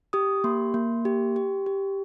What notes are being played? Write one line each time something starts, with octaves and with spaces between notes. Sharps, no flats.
G4 D#6
A#3 C6
A#3
G4
G4
G4